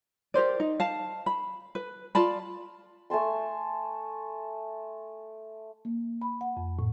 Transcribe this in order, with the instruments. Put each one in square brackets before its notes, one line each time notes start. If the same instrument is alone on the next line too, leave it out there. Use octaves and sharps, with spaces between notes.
[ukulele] G4 A#4 C5 D5
D#4
F5 A5
B5
B4
F4 D5 A5 B5
[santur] A3 G#5 A5 C6
[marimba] A#3
B5
F#5
F2
A2